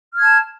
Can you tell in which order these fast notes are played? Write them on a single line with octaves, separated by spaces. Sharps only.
F6 G#6 A5